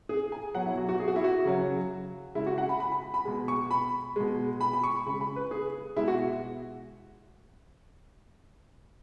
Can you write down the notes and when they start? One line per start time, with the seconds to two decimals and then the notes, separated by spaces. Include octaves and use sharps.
0.09 G#4
0.32 G#5
0.55 B2 F#3 F#5
0.66 E4
0.77 F#4
0.89 F#4
1.00 G#4
1.08 F#4
1.16 E4
1.24 F#4
1.45 C#3 F#3
2.35 C#3 G#3 E4
2.46 F#4
2.58 F#5
2.69 B5
2.80 B5
2.92 B5
3.14 B5
3.25 B2 G#3
3.48 C#6
3.71 B5
4.16 B2 G#3
4.61 B5
4.73 B5
4.83 C#6
5.06 C#3 B5
5.10 G#3
5.21 B5
5.36 B4
5.51 G#4
5.96 B2 G#3 E4
6.08 F#4